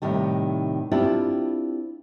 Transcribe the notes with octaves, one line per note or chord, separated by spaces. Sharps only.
A2 C3 D#3 G3
C4 D4 E4 F4 G4